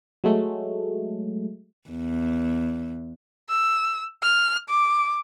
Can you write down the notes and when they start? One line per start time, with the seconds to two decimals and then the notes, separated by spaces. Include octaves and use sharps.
0.24 F#3 G#3 A3
1.90 E2
3.50 E6
4.23 F6
4.69 D6